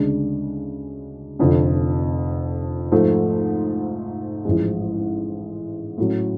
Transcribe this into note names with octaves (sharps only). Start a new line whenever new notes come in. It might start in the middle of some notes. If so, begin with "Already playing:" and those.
Already playing: D2 C#3 G#3 D4
F1 F2 D3
G#2 F3 A3
A1 G#2 F3 G#3
A2 F#3 C#4